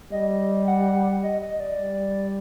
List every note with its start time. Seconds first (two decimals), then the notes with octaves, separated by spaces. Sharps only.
0.12 G3 D#5
0.67 F#5
1.23 D#5
1.42 D#5
1.60 D5
1.79 G3